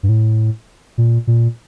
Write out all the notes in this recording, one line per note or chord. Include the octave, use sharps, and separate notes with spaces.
G2
A2
A#2
A#2